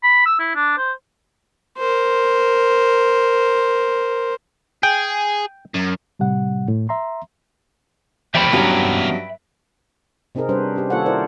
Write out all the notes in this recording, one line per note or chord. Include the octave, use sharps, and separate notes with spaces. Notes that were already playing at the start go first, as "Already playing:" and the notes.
B5
E6
E4
D4
C5
A#4 C5
G#4 G5
F#2
A2 C3 G3 F#5
A2
E5 A#5 C6
E3 F3 A#3 G4 E5 G5 B5
G2 F#3 B3 C#4 A#5
C3 C4 D#4 G#4 A#4
G3 C#4 D4 B4 C5
C#4 G4
D#3 A#3 F4 A4 C#5 F#5
E4 A#4 C5 D5